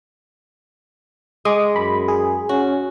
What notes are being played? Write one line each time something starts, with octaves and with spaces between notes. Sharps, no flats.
G#3 D6 D#6
F#2 B5
G#4
C#4 F#4